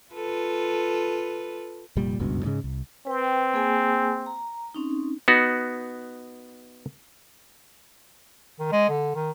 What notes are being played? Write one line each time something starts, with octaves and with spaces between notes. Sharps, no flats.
F4 A4 B4
F1 A#2 G3
F#1 C#2 G2 B2
G#2 C#3 G#3
C2
C4 B4 G5
A#3 G#4 G#5
A#5
C4 C#4 D#4
B3 D#4 F#4
D#3
G#3
D3
D#3